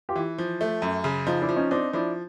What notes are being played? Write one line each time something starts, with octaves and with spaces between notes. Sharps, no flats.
F4 G4
E3
F3
A3
F#2
C#3
F3 D#4 F4
D4 E4
F3
C#4 D#4
C4 D4 D#4
F3 D4 E4